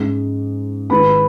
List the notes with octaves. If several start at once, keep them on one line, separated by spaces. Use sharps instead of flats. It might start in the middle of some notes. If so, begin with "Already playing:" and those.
Already playing: G#2 G#3 C#4
G#1 G#2 G#3 E4 B4 B5